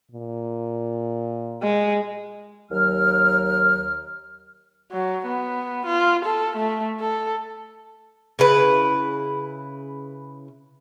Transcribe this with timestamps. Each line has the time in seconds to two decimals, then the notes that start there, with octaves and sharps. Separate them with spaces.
0.11 A#2
1.62 G#3
2.71 D#2 F#3 F6
4.92 F#3
5.27 B3
5.86 F4
6.25 A4
6.57 A3
7.00 A4
8.39 C#3 E4 B4